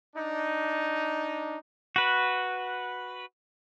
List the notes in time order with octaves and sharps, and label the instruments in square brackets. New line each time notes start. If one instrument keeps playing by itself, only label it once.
[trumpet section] D4 D#4
[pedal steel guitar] F#4 B4